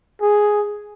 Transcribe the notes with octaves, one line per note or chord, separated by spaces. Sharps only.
G#4